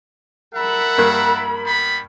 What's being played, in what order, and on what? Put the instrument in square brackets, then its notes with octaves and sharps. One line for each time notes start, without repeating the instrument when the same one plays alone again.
[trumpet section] A4 E5 F#5 [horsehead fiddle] A#4 B5
[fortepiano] G2 A#3 F#6
[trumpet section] G3 B3 B5